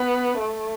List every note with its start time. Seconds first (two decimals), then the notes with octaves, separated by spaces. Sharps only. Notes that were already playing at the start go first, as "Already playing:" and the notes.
Already playing: B3
0.40 A3